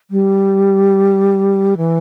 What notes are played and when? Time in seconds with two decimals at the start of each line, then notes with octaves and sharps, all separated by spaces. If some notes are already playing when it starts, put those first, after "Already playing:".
0.11 G3
1.77 E3